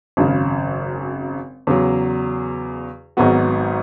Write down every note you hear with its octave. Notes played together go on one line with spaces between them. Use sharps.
G#1 F#2 C#3
E2 C#3 F#3
G#1 G#2 F#3 B3 F#4